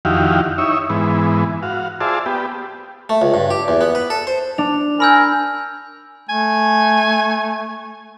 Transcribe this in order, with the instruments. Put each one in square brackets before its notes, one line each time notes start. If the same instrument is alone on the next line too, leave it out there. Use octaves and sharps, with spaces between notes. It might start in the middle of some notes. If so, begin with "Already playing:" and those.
[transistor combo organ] F2 D#3 E4 F#4 G4 F5
D#4 E4 C#5 E5
G#2 E3 B3
F#4 F5
F4 G#4 C5 D5 E5 A5
B3 G4
[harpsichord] A3
C#2
G2
G4
E2
B3
B4
A4
C5
[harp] D4 [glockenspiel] F7
[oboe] A#4 [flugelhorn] G#5 [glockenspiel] B5 E6 G6
[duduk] A3 [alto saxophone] G#5